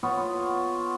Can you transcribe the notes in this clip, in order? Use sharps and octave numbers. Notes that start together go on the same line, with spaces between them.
B3 F4 C#5